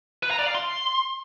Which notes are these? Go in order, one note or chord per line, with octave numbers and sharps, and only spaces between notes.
B4
A#5
D5
F5
C6